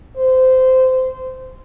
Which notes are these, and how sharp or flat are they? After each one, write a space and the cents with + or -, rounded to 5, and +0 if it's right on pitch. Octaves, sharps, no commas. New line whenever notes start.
C5 -20